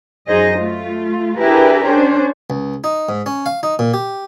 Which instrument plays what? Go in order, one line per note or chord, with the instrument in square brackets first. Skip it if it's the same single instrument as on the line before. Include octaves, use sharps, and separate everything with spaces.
[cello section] F#2 D#4 G#4 C5 D#5
A3 F4
D4 E4 G4 G#4 A#4 B4
C#4 D4 C5
[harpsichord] C#2
D#4
G#2
C#4
F5
D#4
A#2
G4